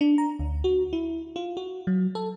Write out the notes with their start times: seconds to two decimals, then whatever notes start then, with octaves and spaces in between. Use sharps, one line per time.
0.01 D4
0.18 A#5
0.39 D2
0.64 F#4
0.93 E4
1.36 F4
1.57 F#4
1.87 F#3
2.15 A4